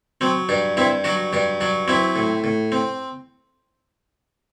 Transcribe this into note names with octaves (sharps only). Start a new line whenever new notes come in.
F#3 C4
G2 D4
G2 C4 E4
F#3 D4 F#4
G2 D4
F#3 D4
F#3 C4 E4
A2
A2
C4